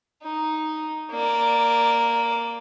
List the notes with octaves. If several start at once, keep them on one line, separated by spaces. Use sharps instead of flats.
D#4
A#3 D5